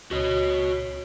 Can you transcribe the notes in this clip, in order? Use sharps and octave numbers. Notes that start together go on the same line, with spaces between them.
C#2 C#4 F#4 C#5 D#5